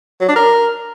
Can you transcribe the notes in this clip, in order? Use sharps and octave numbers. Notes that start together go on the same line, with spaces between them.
F#3
D4
A#4